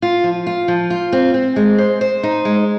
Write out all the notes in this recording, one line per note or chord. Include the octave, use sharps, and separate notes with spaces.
F4
F3
F4
F3
F4
C4
C4
G#3
C5
C5
D#4
G#3